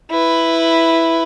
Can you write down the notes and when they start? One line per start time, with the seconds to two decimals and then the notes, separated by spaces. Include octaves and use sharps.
0.11 E4 B4